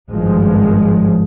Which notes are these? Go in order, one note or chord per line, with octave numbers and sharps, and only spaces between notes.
G#1 G2 F3 G#3